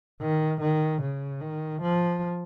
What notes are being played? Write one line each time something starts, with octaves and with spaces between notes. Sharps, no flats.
D#3
D#3
C#3
D#3
F3